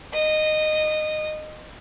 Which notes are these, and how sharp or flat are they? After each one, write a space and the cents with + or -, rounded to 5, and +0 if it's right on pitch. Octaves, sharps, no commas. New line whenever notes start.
D#5 -15